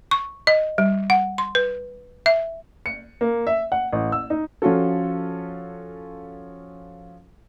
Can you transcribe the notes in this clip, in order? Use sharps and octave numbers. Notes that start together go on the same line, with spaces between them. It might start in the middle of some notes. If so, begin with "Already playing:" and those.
C#6
D#5
G3
F#5
C6
B4
E5
C#7
A#3
E5
F#5
A1
E6
D#4
F3 C#4 F4 F#4 A4